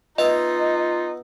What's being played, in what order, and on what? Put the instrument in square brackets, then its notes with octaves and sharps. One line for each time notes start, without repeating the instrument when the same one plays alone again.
[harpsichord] B3 E5 [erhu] D#4 [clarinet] F4 [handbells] D#5